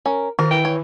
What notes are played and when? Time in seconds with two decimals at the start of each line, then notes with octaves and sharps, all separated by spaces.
0.06 C#4 A#4
0.39 D#3 F3 A#4
0.50 E3 G5
0.65 C#5